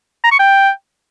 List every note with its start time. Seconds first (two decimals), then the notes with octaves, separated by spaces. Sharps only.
0.24 A#5
0.32 C#6
0.39 G5